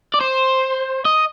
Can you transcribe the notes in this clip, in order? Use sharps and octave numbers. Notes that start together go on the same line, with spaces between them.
D5
C5
D#5